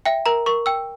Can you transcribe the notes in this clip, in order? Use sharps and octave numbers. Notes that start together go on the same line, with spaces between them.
E5 G5
A#4 A#5
A#4 C#6
G5 E6